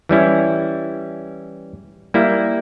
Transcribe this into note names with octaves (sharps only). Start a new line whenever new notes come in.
E3 G3 C#4 E4
G3 A#3 E4